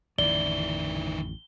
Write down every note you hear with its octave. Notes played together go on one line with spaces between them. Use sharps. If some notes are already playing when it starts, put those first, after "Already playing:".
A1 F2 D3 D#3 E4 D5 G7